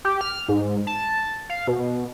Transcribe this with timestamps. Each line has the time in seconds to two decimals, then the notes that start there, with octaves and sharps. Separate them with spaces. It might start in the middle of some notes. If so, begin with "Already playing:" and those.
0.05 G4
0.21 F6
0.49 G#2
0.87 A5
1.49 F5
1.68 B2